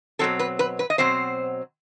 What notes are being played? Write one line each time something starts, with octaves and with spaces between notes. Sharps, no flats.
B2 F#3 C4 A4
B4
B4
B4
D#5
B2 F#3 C4 C5